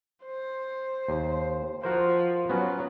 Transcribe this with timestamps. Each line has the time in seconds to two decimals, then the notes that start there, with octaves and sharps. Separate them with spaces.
0.25 C5
1.08 D#2
1.83 F3 F#4 A#4 C5
2.49 F#3 B3 C#4 F#4